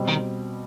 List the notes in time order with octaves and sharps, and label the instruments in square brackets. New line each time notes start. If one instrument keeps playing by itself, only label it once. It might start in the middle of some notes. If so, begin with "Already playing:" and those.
Already playing: [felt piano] B2 G3 C4
[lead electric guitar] D#3